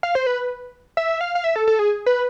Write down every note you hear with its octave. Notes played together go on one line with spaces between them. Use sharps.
F5
C5
B4
E5
F5
F5
E5
A4
A4
G#4
B4